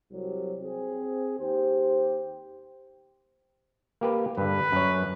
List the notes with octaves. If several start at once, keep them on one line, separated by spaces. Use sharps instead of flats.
C2 F#3 G3 C4
C4 G#4
D#2 G4 C5
A#3 G4 B4
G2 D3 B4
F#2 C#5